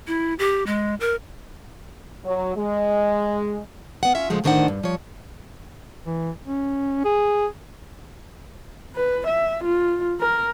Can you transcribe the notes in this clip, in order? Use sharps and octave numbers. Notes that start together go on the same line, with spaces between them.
E4
G4
G#3
A#4
F#3
G#3
B3 F#5
C#4 F4 E5
C#3 F3 G#3 A3
D2 A2 D#3 D4 C5 F#5
G2
F3 C#5
E3
C#4
G#4
B4
E5
F4
A#4